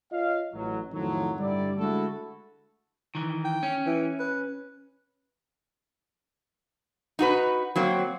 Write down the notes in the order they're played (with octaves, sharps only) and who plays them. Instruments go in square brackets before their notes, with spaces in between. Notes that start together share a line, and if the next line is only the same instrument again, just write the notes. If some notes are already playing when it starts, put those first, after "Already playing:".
[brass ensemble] F4 C#5 D#5 F5
A1 F#3
F2 A2 D#3 F3 F#3
G2 D3 G3 E4 D5
D3 G#3 A3 E4 F#4 A4
[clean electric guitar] D#3 E3
[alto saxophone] G5
[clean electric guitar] C#4
[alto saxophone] E3
B4
[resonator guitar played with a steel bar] D#4 F#4 B4
F#3 A#3 C4